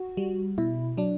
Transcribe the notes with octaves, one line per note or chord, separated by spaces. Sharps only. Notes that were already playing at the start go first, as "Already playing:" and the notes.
Already playing: F#4
G3
B2 E4
F#3 D4